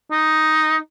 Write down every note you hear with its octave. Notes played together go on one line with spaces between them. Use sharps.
D#4